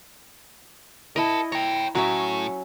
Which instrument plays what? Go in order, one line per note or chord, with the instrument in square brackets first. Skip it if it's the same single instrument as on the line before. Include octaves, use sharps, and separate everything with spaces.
[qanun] E4 D#5 [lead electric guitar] A#4 A5
[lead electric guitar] C#5 G5 [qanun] A#5
[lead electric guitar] A2 [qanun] F#3 C#4 E5